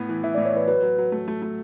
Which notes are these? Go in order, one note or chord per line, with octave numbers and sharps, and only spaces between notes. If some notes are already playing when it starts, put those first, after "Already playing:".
Already playing: A2 B3
E3
E3 E5
D5
A2
C#5
E3 B4
F#3 B4
F#3
F#3
A3
A3
A3